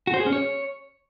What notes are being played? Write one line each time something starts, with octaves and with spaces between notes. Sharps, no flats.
F#4
C5
G#4
C#4
C#5